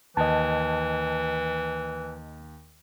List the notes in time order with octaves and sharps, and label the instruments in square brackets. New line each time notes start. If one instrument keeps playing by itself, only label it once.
[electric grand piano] D#2 [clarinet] E3 [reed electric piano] D#5 A5